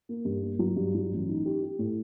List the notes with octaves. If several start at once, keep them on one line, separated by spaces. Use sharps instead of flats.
A#3
G2
A#3
F#3
G2
F#3
A1
D#4
G4
G4
A2